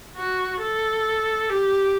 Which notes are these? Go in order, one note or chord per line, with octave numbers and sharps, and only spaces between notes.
F#4
A4
G4